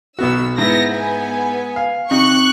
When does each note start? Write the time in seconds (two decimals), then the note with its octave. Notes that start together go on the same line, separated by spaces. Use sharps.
0.19 B1 B3 F#4 E6
0.58 G#2 B3 E4 A#6
0.94 B3 G#5
1.76 F5
2.11 C3 D#4 C#6 F#6